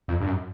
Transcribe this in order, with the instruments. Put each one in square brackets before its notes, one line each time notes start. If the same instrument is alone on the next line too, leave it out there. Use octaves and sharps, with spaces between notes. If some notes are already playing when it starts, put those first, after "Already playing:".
[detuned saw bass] F2
G2
F#2